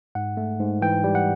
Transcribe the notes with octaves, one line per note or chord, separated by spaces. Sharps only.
G#2 F#5
A3
G#2
E3 G5
G3
F#5